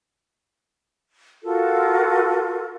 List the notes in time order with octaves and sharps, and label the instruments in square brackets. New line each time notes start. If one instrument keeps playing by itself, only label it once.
[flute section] F4 F#4 A4 A#4